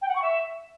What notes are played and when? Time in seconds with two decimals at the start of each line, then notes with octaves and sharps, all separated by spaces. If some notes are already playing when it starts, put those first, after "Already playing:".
0.01 G5
0.08 F#5
0.15 C#6
0.22 E5